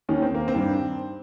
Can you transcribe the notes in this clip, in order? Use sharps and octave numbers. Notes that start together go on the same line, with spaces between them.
D#2 D#3 C#4
C4
A#3
C4
G2 D#3